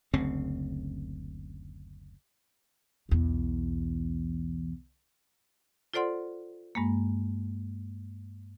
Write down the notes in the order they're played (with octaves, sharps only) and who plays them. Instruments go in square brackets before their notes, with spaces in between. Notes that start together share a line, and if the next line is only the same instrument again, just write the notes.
[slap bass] F#1 D2 C#3 C4
[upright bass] B1 E2
[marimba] F4 A4 C5 D5 F#5 C6
G2 G#3 A#3